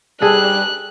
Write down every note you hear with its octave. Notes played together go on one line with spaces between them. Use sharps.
G3 G#4 A4 F#6